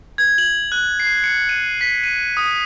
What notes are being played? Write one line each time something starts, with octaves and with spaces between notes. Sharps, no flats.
G#6
F#7
F#6
C7
C#7
D#7
B6
D#7
D#6